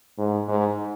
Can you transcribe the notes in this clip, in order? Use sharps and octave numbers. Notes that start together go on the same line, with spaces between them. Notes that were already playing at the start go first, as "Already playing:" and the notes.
G#2
G#2